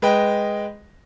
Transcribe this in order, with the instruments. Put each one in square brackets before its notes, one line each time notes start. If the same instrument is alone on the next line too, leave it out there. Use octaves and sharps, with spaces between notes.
[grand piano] G#3 B4 D#5 G5